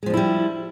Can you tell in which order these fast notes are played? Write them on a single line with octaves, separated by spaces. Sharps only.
G#3 F3 D4 E4 G3